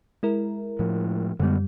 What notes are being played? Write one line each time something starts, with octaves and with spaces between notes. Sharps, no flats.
G#3 E4 A#4
A2 F3
F#2 D3 G3 G#3 B3